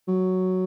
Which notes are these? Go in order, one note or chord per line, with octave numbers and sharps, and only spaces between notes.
F#3